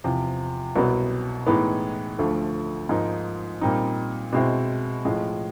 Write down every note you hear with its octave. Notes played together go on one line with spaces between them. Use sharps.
E2 C3 F3
C2 B2 F#3 B3
A2 E3 G#3 B3 D#4
D2 D3 F3 A3
G#2 F3 A#3 D#4
A#2 G3 C4 D#4
B2 G#3 C4 E4
A2 F3 G#3